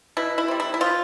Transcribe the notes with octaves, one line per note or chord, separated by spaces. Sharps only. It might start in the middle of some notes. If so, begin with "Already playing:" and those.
B2 E4
E4
G3 C4
E4
E4
F3 F4